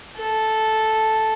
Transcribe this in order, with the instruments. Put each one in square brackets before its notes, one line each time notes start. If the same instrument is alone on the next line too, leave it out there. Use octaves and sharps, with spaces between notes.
[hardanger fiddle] A4